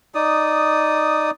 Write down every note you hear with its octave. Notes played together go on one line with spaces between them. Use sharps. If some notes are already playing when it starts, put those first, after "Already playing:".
D#4 D5 D#6